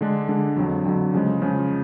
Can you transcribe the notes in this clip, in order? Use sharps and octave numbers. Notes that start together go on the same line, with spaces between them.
D3 G#3 D4
D3 G#3 D4
F2 D3 F#3
F2 D3 F#3
C#3 F3 G#3
C#3 F3 G#3